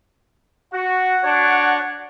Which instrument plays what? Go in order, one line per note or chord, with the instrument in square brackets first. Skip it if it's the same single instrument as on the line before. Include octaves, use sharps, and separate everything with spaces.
[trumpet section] F#4 [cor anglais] F#5
[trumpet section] D4 F#4 C#5